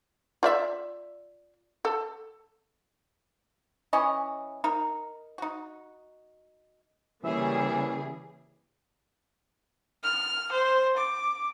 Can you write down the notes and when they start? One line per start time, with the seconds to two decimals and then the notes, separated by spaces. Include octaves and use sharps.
0.43 F4 D5 E5
1.85 A4
3.93 E3 C#4 C#5 D#5
4.64 D#4 A#4
5.38 D#4 F#4
7.24 C#3 E3 G3 A#3 C#4 G#4 E5
10.04 F6
10.52 C5
10.97 D6